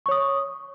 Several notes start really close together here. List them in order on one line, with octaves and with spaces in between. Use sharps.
C#6 C#5 D#6